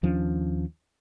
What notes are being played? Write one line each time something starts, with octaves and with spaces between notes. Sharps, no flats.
D#2 F3 C#4 D4